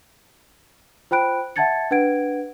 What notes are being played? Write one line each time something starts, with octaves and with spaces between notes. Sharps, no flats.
F4 C5 G5 B5 F#6 D7
E5 F#5 A5 G#6 A6 C#7
D4 B4 F#5 G#6 D7